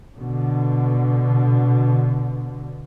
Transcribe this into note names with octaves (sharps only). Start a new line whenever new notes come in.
B2 D3